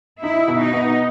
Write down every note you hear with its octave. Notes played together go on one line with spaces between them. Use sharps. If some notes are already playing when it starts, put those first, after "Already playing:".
D#4 E4
B2
D#4
B3